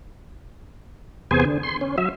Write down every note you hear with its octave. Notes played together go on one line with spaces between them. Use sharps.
E2 C3 B3 G#4 C5 G#5
D3
C6
C#4
F#3 E5